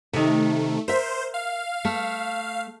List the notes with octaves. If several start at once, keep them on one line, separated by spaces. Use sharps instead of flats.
C3 D#3 A3
A#4 C5 E5
F5
A3